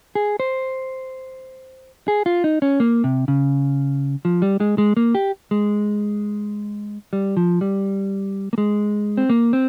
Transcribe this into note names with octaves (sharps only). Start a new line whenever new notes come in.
G#4
C5
G#4
F4
D#4
C#4
A#3
C3
C#3
F3
G3
G#3
G#3
A#3
G4
G#3
G3
F3
G3
A#3
G#3
C4
A#3
C4